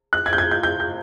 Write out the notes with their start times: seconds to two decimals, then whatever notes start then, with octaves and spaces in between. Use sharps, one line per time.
0.13 F#6
0.26 G#6
0.33 G6
0.38 G#6
0.51 G6
0.63 G6
0.80 G6